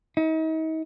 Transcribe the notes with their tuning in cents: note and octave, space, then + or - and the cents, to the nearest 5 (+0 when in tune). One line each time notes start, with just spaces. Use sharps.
D#4 +40